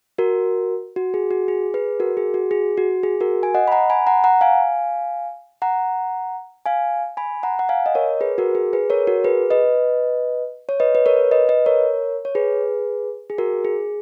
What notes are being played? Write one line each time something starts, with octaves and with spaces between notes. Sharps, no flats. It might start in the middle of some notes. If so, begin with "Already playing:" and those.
F#4 A#4
F#4
G#4
F#4
G#4
G#4 B4
F#4 A#4
G#4
F#4
G#4
F#4
G#4
F#4 A#4
G#5
D#5 F#5
B5
F#5 A#5
G#5 B5
F#5 A#5
F#5 A#5
F5 G#5
F#5 A#5
F5 G#5
G#5 B5
F#5 A#5
F#5
F5 G#5
D#5
A#4 C#5
G#4 B4
F#4 A#4
G#4
G#4 B4
A#4 C#5
F#4 A#4
G#4 B4
B4 D#5
C#5
B4 D#5
B4
A#4 C#5
B4 D#5
B4 D#5
A#4 C#5
C#5
G#4 B4
G#4
F#4 A#4
G#4